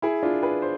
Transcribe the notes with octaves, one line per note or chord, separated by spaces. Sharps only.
E4 G#4
D4 F4
G#4 B4
C5